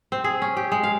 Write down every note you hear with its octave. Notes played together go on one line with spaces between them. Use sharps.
C4
G#4
C#4
G4
G#3
F5